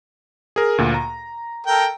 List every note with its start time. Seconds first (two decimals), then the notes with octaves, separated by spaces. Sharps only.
0.56 G#4 A#4
0.78 D2 A#2
0.94 A#5
1.67 A4 A#4 G5